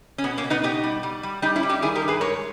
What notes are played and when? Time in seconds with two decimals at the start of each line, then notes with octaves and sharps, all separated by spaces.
0.18 C#4
0.24 B2 B3
0.38 A#3 C#4
0.44 B2
0.50 B3 D#4
0.63 B2 D#4 G4
0.83 G3
1.03 G3
1.23 G3
1.42 G3 D#4 G4
1.56 C#4 E4
1.63 G3
1.69 D#4 G4
1.82 D#3 E4 G#4
1.95 G4 A#4
2.02 G2
2.08 G#4 B4
2.21 G#3 A#4 C#5